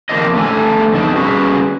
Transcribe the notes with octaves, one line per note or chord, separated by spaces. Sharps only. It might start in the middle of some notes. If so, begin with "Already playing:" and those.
D#3 F3 A#3 C4 D4 D#5
A3 D4 A4 G#5
F2 B2 D#4 A5
G3 C#4 F#4 G#4 B4